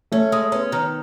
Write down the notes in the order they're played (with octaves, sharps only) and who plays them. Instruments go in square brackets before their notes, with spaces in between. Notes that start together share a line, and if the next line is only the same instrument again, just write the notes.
[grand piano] A3 [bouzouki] C#4
[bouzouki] G#3
[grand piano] B3 [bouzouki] C#4
[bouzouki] D#3